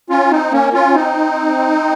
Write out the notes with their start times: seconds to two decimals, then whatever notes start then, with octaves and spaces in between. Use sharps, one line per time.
0.09 C#4 F4
0.31 C4 D#4
0.52 A#3 C#4
0.73 C#4 F4
0.94 C4 D#4